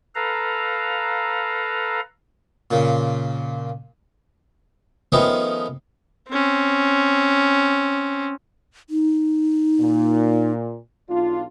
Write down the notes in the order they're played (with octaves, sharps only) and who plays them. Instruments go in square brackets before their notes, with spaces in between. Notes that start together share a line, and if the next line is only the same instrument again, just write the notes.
[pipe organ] A4 B4 F5 A#5
[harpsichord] A#2 C#3
D#3 F3 A3 B3 C#4 D#4
[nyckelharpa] C4 C#4
[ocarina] D#4
[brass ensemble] A#2
B1 D4 F4